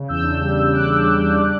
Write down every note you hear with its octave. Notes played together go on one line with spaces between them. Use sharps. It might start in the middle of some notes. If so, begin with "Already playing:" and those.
Already playing: C#3
E2 E6 G6
D4
G3
G3
G3 D6 F#6
D4
G3
D4
G3